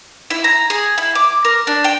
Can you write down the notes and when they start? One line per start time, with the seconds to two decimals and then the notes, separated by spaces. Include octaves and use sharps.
0.30 E4
0.44 A#5
0.70 G#4
0.98 E4
1.15 D6
1.45 A#4
1.67 D4
1.84 G5